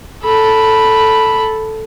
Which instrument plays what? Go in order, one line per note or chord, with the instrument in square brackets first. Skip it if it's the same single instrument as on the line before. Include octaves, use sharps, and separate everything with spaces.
[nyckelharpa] A4 B5